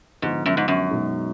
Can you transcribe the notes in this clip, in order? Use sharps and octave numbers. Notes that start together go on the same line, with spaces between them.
G#2 D3 F3 G#3 B3
F#2
G#2
F#2
B2 G#3 D#4